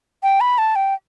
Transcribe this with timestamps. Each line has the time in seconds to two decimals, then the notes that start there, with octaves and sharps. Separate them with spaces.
0.23 G5
0.41 B5
0.58 A5
0.76 G5